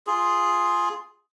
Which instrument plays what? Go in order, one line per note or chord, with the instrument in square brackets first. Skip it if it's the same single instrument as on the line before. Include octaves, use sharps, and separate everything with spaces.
[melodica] F4 G#4